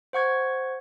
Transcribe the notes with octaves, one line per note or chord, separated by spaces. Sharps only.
C5 F#5 C#6 G#6